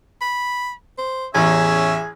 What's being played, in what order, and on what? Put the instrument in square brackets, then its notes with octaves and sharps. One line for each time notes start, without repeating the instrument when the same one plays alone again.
[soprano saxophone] B5
C5
[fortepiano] A1 E2 [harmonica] C#4 E5 [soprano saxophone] G#4